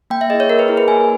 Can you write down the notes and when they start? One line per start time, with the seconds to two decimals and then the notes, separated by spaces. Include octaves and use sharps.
0.10 A#3 G5
0.21 E5
0.30 E4 G#4 D#5
0.40 C#5
0.50 A#3 A#4
0.59 B4
0.68 E4 G#4 A#4
0.77 B4
0.88 A#3 G#5